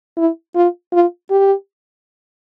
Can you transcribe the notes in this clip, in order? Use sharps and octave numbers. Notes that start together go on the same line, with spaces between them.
E4
F4
F4
G4